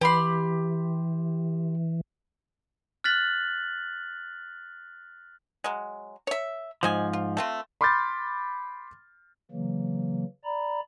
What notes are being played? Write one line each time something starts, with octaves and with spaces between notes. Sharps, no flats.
E3 G4 B5 C6
F6 F#6 A6 B6 F#7
F#3 G#3
C#5 E5
G#2 F3 C5 D#5 G#5
F4
A3 C4 F4
B5 C6 D6 F6 G6 A6
C#3 E3 F#3 A#3
D5 A#5 B5